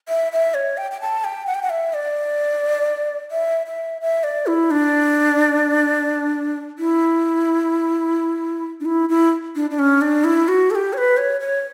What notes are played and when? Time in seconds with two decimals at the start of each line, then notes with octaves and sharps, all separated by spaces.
0.09 E5
0.32 E5
0.54 C#5
0.77 G5
0.91 G5
1.02 A5
1.24 G5
1.47 F#5
1.54 G5
1.63 F#5
1.70 E5
1.94 D5
3.31 E5
3.66 E5
4.01 E5
4.24 D5
4.47 E4
4.71 D4
6.79 E4
8.80 D4
8.85 E4
9.09 E4
9.56 D4
9.70 D4
9.79 C#4
10.01 D4
10.24 E4
10.48 F#4
10.71 A4
10.75 G4
10.93 C#5
10.98 B4
11.17 C#5
11.41 C#5